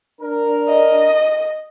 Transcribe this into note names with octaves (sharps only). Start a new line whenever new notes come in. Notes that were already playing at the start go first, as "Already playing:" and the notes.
D4 A#4
D#5